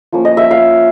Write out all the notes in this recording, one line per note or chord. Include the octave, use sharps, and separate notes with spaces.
F3 A#3 C#4
D#5
E5
F5